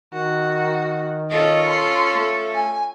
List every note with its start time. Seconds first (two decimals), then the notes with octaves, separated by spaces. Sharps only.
0.13 D#3 F#4
1.30 C#4 F4 A4 D#5
1.70 C6
2.16 A3
2.55 G#5